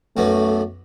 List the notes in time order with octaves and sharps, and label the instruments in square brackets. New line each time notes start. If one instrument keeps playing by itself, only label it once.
[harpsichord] B1 F#2 B3 [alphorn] A3